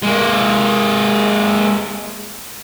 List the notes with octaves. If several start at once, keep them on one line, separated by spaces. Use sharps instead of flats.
G#3 A#3